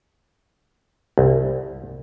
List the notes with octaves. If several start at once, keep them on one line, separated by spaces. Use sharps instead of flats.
C2